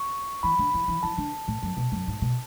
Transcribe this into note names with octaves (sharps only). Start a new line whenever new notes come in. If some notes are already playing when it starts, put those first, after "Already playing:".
Already playing: C#6
E3 B5
D3
E3
E3
E3 A5
D3
A2
F#2
B2
F#2
G#2
B2